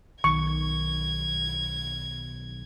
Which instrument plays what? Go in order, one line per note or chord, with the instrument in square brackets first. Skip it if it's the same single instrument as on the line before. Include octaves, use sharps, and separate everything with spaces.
[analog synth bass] B1 [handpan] D#3 [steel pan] C#6 [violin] G#6